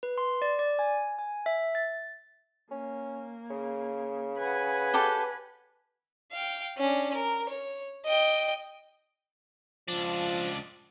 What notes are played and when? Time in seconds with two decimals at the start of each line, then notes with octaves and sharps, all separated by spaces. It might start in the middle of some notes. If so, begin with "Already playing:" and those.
0.03 B4
0.18 C6
0.42 D5
0.59 D5
0.79 G#5
1.19 G#5
1.46 E5
1.75 A6
2.71 A#3 C#4
3.50 C#3
4.38 B4 F#5 G#5
4.94 G4 A4 D6
6.33 F5 G5
6.77 C#4 D4
7.15 A#4
7.49 C#5
8.06 D#5 G5
9.88 C#2 F3 D4